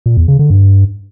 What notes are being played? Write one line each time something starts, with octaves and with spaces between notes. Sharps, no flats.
A#2
E2
C#3
D3
G2